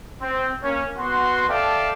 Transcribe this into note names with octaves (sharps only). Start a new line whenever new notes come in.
C4
A#3 C#4 C#5
B3 F#4 C6
A4 D5 E5 F5 G5 A5